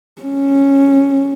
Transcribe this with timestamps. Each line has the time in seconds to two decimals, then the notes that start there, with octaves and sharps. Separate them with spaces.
0.22 C#4